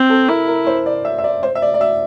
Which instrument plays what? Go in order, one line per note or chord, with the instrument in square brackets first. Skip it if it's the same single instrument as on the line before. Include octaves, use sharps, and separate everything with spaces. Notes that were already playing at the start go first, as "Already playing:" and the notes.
Already playing: [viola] C4
[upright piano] A4
[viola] E4 [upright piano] A#4
[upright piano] A#4
C5
D5
E5
E5
D5
C5
E5
D5
D5
E5